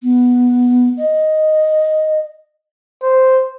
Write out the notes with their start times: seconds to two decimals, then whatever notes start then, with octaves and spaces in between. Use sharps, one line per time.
0.03 B3
0.97 D#5
3.03 C5